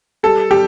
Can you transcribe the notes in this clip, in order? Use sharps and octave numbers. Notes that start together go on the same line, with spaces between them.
G3 A4
G3 G4